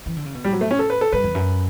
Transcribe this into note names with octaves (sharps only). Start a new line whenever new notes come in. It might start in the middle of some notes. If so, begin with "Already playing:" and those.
E3
D3
C#3
B2
A2 G3
F#3
A3
C#4
A4
B4
A4
G2 B4
E2
F#2